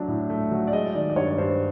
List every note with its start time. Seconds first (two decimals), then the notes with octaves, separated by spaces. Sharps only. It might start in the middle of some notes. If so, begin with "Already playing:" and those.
Already playing: F#3 A3 D4
0.08 A2
0.30 A3
0.51 F#3
0.67 D5
0.73 G#3 D#5
0.95 D#3 D5
1.10 D5
1.16 G2 C#5
1.38 G2 C5